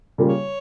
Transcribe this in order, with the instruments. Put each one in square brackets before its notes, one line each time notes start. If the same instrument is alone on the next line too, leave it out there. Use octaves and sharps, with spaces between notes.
[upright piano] C#3 G3 A#3 F4
[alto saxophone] C#5